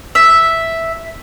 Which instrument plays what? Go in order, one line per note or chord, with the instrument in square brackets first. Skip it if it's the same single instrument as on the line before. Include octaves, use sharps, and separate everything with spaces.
[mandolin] E5